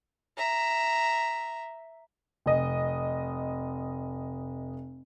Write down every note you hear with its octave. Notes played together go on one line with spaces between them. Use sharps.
E5 A#5
F1 D#5